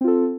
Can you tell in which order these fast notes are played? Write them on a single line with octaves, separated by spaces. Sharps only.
C4 F4 A4